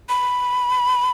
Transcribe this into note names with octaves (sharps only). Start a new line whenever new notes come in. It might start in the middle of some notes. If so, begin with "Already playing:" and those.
B5